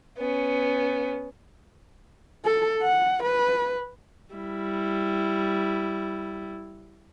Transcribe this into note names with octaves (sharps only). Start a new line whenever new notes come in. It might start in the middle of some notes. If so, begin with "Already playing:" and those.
B3 C#4
A4
F#5
B4
G3 E4